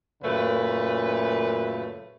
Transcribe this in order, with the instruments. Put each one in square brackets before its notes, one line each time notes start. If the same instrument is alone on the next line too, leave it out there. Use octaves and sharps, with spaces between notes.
[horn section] F#2 A#2 C#3 A3 B4